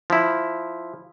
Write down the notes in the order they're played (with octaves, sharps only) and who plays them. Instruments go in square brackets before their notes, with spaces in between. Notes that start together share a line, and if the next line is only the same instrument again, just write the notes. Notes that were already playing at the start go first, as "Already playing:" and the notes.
[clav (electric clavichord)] F3 E4